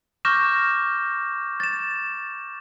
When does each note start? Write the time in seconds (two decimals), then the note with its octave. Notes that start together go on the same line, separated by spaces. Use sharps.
0.25 C#6 D6 F6 G6 A#6 E7
1.60 A6 E7